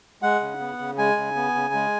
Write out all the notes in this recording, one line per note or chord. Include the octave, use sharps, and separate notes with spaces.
G#3 F#5
C#3
B3
C#3
G#3 G#5
C#3
B3
C#3
G#3